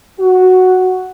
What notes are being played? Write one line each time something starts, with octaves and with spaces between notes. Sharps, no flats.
F#4